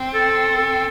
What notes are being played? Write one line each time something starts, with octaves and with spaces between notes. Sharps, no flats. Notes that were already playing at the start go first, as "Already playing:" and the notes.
Already playing: C4
A4
A4